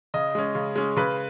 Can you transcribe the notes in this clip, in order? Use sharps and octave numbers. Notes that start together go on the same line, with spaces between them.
C#3 D#5
G#3 C#4
C#3
G#3 C#4
C#3 B4